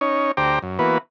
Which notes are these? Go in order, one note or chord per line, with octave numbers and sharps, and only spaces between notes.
C#4 D#4 C#5
D2 G4 C5 G5 A#5 D6
F#2
E3 A#3 B3 F#4 B4